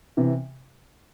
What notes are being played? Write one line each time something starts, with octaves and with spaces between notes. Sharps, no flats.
C3 E3